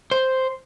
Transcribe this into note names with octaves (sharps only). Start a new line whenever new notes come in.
C5